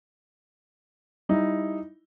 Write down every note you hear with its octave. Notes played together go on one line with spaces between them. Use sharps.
G3 D#4 E4